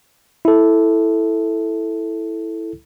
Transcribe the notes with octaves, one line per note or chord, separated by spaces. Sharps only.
E4 A4